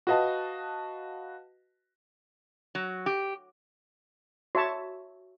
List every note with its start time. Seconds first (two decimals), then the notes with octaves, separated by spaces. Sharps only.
0.07 F#4 B4 D#5 F5 A5
2.75 F#3
3.06 G4
4.55 F#4 C#5 E5 A5